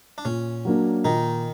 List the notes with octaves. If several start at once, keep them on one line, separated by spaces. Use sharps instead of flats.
D4
A#2 C#4
F#3 A#3 D4
A#2 D#3 D#4